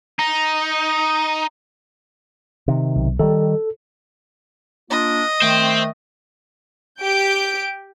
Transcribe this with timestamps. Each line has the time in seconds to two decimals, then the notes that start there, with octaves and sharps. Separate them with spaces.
0.19 D#4
2.68 C3 D#3
2.96 B1
3.19 D#3 G3 A4
4.91 A#3 D4 F4 D#5
5.42 D#3 A3 C5 G5
7.01 G4 G6 D7